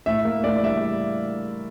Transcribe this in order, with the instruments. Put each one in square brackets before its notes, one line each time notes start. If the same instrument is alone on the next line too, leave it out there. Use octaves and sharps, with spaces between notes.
[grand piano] A2 E5
A#3
A2 D5
G3 E5